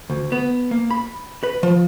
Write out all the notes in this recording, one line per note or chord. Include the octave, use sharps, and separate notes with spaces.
D2
B3
A#3
B5
B4
F3